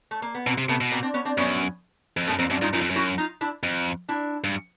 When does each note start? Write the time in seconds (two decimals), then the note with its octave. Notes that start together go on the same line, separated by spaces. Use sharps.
0.11 A3
0.22 A#3
0.35 B3
0.46 B2 A#3 C4
0.58 C3
0.69 C3 A3 B3
0.81 B2
0.92 A#3 C4
1.03 C4 D4
1.14 B3 C#4
1.25 C4 D4
1.37 F#2 B3 C#4
2.17 F2
2.27 F#2 A3 B3
2.39 F2 A#3 C4
2.50 F#2 C4 D4
2.62 G2 D#4 F4
2.72 F#2 D#4 F4
2.81 F2
2.90 F#2
2.96 E4 F#4
3.18 D#4 F4
3.41 D4 E4
3.63 F2
4.09 D4 E4
4.44 G2